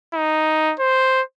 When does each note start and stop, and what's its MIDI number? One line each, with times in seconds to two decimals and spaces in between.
0.14 0.74 63
0.80 1.22 72